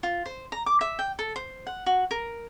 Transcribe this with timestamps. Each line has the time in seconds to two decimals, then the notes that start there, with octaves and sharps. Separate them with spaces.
0.03 F4
0.26 C5
0.52 A#5
0.66 D6
0.81 E5
0.99 G5
1.19 A4
1.36 C5
1.67 F#5
1.86 F#4
2.11 A#4